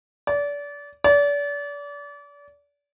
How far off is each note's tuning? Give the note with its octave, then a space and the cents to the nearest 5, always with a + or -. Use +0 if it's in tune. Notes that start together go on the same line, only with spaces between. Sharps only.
D5 -30
D5 -35